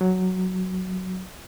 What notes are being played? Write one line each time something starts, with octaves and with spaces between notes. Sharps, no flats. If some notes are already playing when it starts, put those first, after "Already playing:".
F#3